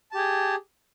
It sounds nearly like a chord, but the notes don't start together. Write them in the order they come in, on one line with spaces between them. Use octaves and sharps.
A5 G4 G#4